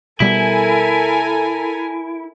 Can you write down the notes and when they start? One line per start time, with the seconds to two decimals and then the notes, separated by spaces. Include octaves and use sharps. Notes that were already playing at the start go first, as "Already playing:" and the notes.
0.20 B2 G3 B3 E4 A4 A#4 G#5